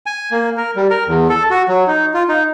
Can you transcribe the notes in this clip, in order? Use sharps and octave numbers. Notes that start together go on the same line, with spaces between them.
G#5
A#3
A#4
G3
A#4
E2
A4
F#4
F#3
D#4
F4
D#4